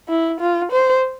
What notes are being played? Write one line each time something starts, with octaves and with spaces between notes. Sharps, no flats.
E4
F4
C5